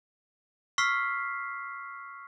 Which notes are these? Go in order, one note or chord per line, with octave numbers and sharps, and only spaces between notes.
C#6 E6 F6 B6 C7